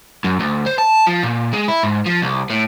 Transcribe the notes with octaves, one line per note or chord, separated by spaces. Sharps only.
F#2
D2
C5
A5
F3
A#2
G#3
E4
G#2
F3
C2
A2